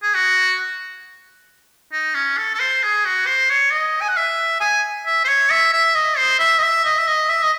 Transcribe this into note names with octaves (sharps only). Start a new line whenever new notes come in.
G#4
F#4
D#4
C#4
A4
A4
C5
G#4
F#4
C5
C#5
D#5
G#5
F#5
E5
G#5
E5
C5
C#5
E5
E5
D#5
C5
E5
D#5
E5
D#5
E5
D#5
E5
D#5